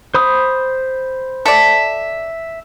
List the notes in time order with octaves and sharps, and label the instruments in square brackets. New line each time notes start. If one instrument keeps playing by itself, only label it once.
[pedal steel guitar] C5 B5 D#6
[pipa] A4 D5 [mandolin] E5